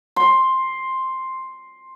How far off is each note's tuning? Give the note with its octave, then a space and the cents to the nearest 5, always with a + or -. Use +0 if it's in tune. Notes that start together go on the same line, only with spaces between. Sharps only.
C6 +5